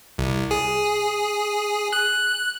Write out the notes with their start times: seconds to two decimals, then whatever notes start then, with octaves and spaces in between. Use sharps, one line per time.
0.18 C2
0.51 G#4
1.93 F#6